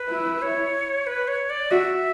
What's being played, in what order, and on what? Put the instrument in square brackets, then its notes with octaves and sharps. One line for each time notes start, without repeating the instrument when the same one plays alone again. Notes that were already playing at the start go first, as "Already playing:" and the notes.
Already playing: [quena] B4
[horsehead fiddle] E4
[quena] B4
C#5
B4
C#5
D5
[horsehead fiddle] F#4 [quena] E5